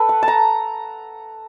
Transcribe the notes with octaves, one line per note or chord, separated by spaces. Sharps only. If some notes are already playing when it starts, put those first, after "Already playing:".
Already playing: A4 B4
F#5
A5
A#5